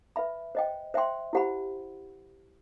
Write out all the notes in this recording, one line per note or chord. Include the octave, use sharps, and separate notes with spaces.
B4 E5 B5
C5 D#5 G5
C5 E5 G5 C6
E4 G4 C5 F#5 B5